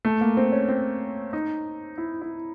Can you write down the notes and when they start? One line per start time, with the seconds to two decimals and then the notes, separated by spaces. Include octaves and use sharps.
0.05 A3
0.21 A#3
0.37 C4
0.52 C#4
0.68 C4
1.33 D#4
1.98 E4
2.21 E4